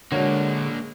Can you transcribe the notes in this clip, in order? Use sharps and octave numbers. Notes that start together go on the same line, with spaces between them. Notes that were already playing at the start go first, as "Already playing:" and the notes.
D3 G#3 A#3 D4 F#4 C#5